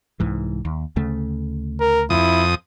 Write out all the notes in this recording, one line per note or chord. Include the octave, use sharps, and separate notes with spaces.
C2 G#2 E3
D#2
D2 C#3 A3
A#4
F2 E4 D#6